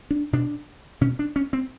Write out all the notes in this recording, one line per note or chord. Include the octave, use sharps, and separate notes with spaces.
D4
B2 D4
B2 C#4
D4
C#4
C4